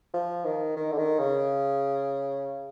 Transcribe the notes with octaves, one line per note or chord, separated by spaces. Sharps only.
F3
D#3
D#3
D3
D#3
C#3